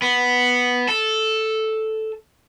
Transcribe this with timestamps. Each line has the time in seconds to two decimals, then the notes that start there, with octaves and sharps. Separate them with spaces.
0.02 B3
0.88 A4